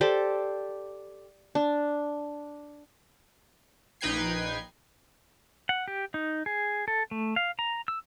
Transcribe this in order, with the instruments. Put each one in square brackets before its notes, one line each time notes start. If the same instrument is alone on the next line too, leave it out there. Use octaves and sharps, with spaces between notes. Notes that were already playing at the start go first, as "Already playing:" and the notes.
[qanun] G4 A4 C5 D5
D4
[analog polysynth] A#1 D#4 B4 G5 G#6 C7
[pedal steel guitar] F#5
G4
D#4
G#4
A4
A3
F5
A#5
E6